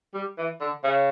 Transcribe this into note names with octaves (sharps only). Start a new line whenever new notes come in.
G3
E3
D3
C#3